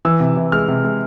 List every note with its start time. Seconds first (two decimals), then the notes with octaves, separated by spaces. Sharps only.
0.05 E3 E6
0.20 C3
0.37 E3
0.52 G#3 F6
0.68 C3
0.84 G#3